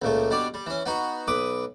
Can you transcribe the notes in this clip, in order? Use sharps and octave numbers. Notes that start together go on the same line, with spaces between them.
C#2 A#2 A3
B2 G3 D4 D5
G3
E3 C#4
B3 D#4 F#4
B1 B4 D6 D#6